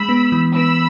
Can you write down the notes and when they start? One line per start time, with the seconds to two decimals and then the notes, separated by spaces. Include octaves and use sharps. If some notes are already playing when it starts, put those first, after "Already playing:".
Already playing: G#3 B5 E6
0.09 B3
0.32 E3
0.55 B3 B5 E6